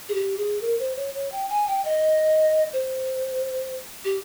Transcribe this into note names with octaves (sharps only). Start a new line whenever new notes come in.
G#4
G4
G#4
A#4
C5
C#5
C#5
G5
G#5
G5
D#5
C5
G4